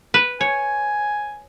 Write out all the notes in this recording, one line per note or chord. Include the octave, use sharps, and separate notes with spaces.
B4
C#5 G#5